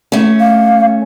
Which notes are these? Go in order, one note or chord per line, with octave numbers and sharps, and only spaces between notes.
A3 C#4
F5